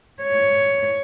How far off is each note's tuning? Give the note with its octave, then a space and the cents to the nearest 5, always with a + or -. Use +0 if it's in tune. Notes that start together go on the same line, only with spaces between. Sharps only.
C#5 +5